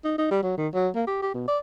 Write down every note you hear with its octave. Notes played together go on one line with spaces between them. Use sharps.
D#4
D#4
G3
F#3
D#3
F#3
A#3
G4
G4
B2
D5